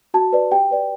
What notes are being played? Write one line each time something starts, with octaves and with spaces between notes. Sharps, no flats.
F#4 A5
B4 D5
G4 G5
B4 D5